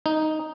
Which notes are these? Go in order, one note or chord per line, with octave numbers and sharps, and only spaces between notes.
D#4